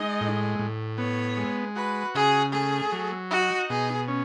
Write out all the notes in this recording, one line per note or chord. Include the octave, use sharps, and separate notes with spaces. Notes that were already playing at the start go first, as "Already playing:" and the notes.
Already playing: G#3 D#4 D#5
A2
A2
B3 C#5
G#3
F#4 B4
C#3 G#4
A3 G#4
F#3
D#4 F#4
B2 G#4
C#4